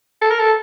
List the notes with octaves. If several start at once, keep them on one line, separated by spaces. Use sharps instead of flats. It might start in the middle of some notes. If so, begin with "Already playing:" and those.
A4
A#4
A4